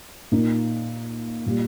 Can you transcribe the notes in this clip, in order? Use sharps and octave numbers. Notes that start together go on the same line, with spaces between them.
A#2 A#3 D#4
A#2 G3